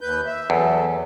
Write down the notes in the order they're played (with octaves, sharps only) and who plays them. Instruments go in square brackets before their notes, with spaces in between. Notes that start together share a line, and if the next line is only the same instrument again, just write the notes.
[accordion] D#2 B4 G6
E5
[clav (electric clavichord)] E2 [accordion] F#3 A4